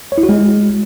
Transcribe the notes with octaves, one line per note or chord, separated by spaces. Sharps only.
C#5
E4
F#4
G#3